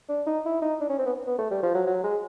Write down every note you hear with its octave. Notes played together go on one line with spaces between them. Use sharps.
D4
D#4
E4
D#4
D4
C#4
C4
B3
B3
A3
G3
F3
F#3
F#3
G#3